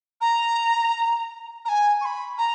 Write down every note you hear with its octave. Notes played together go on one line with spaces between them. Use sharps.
A#5
A#5
G#5
C#6
B5
A#5